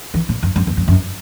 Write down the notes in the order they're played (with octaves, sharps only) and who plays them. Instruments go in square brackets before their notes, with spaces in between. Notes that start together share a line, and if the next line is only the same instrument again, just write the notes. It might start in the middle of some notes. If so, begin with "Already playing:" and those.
[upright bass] E3
A2
F#2
F#2
E2
F#2
F#2